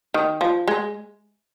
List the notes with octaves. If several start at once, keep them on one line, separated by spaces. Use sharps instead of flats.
D#3
F3
G#3